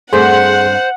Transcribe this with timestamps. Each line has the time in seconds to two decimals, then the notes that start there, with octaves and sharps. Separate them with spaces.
0.13 G2 A3 C4 G#4 C5 F#5 C6